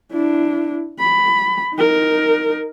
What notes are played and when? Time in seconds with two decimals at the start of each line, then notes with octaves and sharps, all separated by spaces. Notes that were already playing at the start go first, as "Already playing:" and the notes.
0.12 D4 E4
0.99 B5
1.75 D#4 A#4